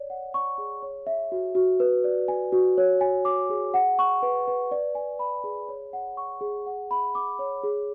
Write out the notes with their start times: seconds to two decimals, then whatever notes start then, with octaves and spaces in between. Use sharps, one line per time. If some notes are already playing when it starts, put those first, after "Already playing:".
Already playing: C#5 D5
0.10 F#5
0.34 C#6
0.58 G#4
0.82 C#5
1.07 E5
1.32 F#4
1.55 F#4
1.80 B4
2.04 D5
2.28 G#5
2.52 F#4
2.78 C#5
3.01 G#5
3.25 D6
3.50 G#4
3.74 F#5
3.99 C#6
4.23 B4
4.48 B4
4.71 D5
4.95 G#5
5.19 B5
5.44 G#4
5.69 C#5
5.93 F#5
6.17 C#6
6.41 G#4
6.66 F#5
6.91 B5
7.15 D6
7.39 C#5
7.63 G#4